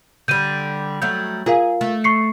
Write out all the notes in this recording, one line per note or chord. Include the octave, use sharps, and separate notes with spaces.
D3 G3 G6 D#7
F#3 G3 A3 G6
F4 G#4 A#4 F5
A3
C#6 C7 C#7